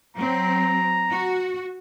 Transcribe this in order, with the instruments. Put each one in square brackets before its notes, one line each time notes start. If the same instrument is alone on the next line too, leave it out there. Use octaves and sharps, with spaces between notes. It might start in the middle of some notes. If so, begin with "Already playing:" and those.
[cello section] F#3 C4 [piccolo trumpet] A#5
[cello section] F#4